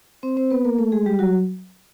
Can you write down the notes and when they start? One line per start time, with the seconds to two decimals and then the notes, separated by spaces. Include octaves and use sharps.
0.23 C4 C5
0.37 C4 C5
0.51 B3 B4
0.65 A#3 A#4
0.78 A3 A4
0.92 G#3 G#4
1.06 G3 G4
1.19 F#3 F#4